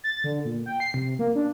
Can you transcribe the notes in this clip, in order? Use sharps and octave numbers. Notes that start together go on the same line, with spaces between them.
A6
D3
A#2
G5
C7
C3
A#3
D4